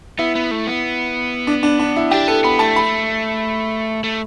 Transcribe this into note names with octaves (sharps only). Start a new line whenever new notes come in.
B3 E4
B3
A3
B3
D4
D4
D4
E4
D4 G4
B3 A4
B3 B5
A3 A5
B5
A3